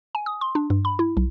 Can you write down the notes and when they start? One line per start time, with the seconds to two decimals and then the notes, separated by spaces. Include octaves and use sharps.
0.15 G#5
0.26 D#6
0.41 C6
0.55 D4
0.70 G2
0.85 B5
0.99 E4
1.17 B1